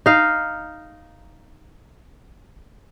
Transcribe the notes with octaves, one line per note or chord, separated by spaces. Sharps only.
D#4 F5